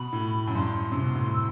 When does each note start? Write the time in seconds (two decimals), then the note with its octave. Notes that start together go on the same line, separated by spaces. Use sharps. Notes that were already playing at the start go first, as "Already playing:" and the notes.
Already playing: B2 B5
0.13 A2
0.47 F#2
0.55 G2 C6
0.92 C3
1.04 B2
1.15 A2
1.33 E6